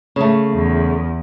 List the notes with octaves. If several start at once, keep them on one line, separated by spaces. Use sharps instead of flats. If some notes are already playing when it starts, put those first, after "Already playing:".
C#3 A3
E2